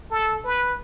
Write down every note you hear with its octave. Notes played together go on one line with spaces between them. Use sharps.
A4
B4